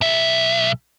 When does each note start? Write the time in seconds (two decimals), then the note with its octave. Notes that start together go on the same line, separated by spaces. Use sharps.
0.01 B1 E5